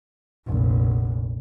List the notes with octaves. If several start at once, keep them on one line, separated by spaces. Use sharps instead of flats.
F1 A#1